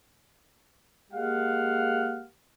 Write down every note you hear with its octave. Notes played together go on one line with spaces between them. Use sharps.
G#3 A#3 G4 F5 F#5